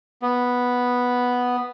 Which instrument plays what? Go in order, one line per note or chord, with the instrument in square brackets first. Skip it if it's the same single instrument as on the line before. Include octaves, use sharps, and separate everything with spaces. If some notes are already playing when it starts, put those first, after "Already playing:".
[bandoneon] B3